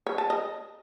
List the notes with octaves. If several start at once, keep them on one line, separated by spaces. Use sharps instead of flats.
C#5
A5
D#5